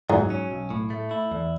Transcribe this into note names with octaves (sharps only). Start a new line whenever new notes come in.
G#2 F#3
C#4
B1
A2
A3
E4
E2